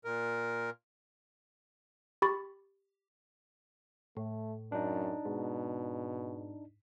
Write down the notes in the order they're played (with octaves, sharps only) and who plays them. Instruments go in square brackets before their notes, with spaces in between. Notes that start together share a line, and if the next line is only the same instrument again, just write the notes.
[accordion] A#2 A#4
[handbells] G4 B5 C#6 A6
[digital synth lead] A2 [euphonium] A3
[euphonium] F#2 [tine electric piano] D4 D#4
[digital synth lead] G#2 [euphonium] B2